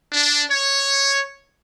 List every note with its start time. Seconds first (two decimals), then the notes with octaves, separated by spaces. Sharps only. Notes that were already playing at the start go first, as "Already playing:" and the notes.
0.13 D4
0.51 C#5